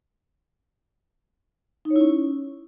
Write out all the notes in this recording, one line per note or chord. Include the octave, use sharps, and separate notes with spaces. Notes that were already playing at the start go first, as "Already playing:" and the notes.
D#4
C#5
E4
C#4